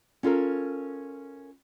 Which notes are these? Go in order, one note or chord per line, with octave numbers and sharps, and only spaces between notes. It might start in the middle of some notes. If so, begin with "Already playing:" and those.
C#4 F4 A4 A#4